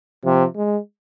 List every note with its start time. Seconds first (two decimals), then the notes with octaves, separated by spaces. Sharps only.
0.25 C3 F3
0.56 G#3